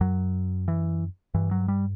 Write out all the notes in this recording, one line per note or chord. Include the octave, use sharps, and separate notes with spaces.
F#2 F#3
E3
G2 E3
F#3
G3